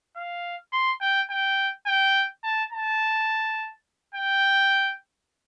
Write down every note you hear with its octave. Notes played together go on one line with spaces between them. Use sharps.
F5
C6
G5
G5
G5
A5
A5
G5